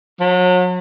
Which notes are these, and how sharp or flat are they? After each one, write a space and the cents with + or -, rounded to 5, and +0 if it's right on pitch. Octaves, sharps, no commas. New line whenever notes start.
F#3 -35